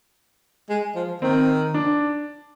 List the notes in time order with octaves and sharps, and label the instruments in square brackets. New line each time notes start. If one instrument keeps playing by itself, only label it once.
[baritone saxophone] G#3
F3
[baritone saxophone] D#3 [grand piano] C4
[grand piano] D4